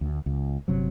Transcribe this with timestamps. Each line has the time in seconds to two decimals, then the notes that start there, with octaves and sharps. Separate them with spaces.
0.01 D2
0.26 C#2
0.68 G1 C3 F#3